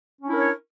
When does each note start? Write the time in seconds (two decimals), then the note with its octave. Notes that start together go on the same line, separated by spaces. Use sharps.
0.20 C#4
0.25 D4
0.29 E4
0.34 A#4
0.38 C#5